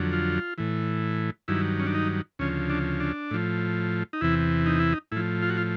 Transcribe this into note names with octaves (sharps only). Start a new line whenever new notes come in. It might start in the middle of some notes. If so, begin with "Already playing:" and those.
Already playing: F2 D3 F#3
F4
A2 E3
G2 D#3 F#3 E4
C#4
D4
D#4
D2 C#3 F3 C#4
D4
D4
A2 F3
D#4
E2 C3 E3 E4
D#4
E4
D#4
A2 F3 E4
F4
F#4
F4